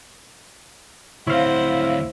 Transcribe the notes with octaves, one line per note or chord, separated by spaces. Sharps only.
D2 C4 E4 C5 C#5 F5 F#5